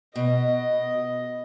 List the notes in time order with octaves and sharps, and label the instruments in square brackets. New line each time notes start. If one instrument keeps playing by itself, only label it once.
[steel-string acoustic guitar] B2 [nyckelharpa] D#5